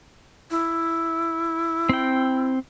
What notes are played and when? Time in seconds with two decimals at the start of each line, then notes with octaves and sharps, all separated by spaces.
0.51 E4
1.89 C4 G5